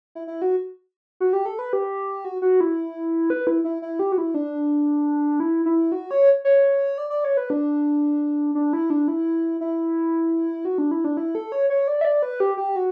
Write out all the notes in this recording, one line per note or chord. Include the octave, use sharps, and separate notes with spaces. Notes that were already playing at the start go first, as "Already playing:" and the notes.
E4
E4
F#4
F#4
G4
A4
B4
G4
F#4
F#4
E4
B4
E4
E4
E4
G4
F#4
E4
D4
E4
E4
F#4
C#5
C#5
D5
D5
C#5
B4
D4
D4
E4
D4
E4
E4
F#4
D4
E4
D4
E4
A4
C#5
C#5
D5
E5
D5
B4
G4
G4
F#4